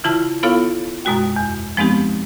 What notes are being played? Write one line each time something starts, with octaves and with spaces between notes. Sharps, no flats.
C#3 E3 E4 F4 A5 F6
B3 E4 F4 A4 C#5 F5
F#2 B2 G#3 F#4 G5
E2
F3 G#3 B3 C4 D#4 G4